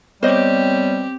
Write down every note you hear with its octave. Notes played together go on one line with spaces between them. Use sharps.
G3 B3 C4 G4 C5 C#5 D#5